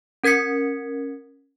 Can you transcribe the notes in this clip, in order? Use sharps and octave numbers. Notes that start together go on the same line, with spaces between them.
C#4 A#4 G#6 B6 C#7